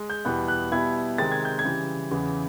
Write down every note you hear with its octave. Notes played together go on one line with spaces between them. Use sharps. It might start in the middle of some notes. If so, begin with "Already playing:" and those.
Already playing: G#3
G6
E2 B2 G3 B3 E4 F#6
F#6
B2 G3 B3 E4 G#6
C3 D#3 G#3 C4 A6
G#6
G6
G#6
C#3 E3 G3
E2 C#3 E3